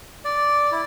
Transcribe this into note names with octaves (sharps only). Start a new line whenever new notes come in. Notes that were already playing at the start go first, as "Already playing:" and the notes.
D5
E4